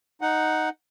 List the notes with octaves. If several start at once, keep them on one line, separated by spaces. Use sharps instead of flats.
D#4 F#5